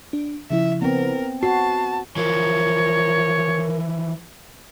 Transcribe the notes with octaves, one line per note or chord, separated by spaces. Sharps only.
D4
C#3 F3 E4 E5
B3 C4 A#4
F#4 A5 C7
E3 F3 A#4 C#5